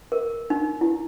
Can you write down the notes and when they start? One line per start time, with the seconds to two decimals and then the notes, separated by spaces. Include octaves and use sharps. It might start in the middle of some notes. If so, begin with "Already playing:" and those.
0.12 A#4
0.50 D#4
0.81 E4